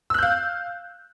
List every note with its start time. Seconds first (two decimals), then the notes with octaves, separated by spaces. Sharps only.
0.10 E6
0.14 F#6
0.18 G6
0.23 F5